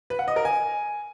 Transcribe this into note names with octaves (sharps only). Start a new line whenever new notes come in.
B4
F#5
D#5
A#4
G#5